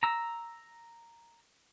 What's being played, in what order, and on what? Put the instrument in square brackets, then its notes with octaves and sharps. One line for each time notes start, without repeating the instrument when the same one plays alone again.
[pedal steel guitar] A#5 E6